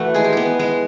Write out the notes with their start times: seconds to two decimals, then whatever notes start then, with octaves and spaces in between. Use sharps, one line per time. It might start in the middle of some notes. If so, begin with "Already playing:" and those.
Already playing: E3 A3 F#4
0.14 G#3 G#4
0.24 G4
0.33 B3 G#4
0.59 G#3